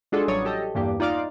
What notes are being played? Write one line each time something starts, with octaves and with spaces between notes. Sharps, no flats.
G#3 D4 F4 F#4 G#4 A4
A1 F#3 G3 C#5 D5 D#6
G4 A4 D#5
E2 G2 A#3 G4
D#4 F4 D5 F5 D6